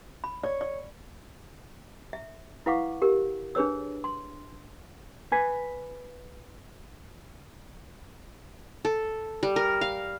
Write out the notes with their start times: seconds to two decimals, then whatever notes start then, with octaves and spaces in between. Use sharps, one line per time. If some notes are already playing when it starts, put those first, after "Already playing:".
0.24 B5
0.43 C#5 D5
0.61 D5
2.13 E5
2.66 E4 B4 F5 F#5 C#6 D6
3.02 G4 A#4
3.55 D4 G#4 B4 C#5 E6
4.04 C6
5.32 B4 G#5
8.85 A4
9.43 G3
9.56 A#4
9.81 F5